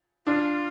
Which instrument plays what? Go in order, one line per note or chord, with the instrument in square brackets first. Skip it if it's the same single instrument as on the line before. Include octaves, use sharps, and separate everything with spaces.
[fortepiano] D4 [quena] F4